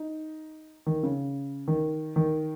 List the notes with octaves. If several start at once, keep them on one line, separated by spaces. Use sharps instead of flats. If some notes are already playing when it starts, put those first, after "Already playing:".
Already playing: D#4
D#3
C#3
D#3
D#3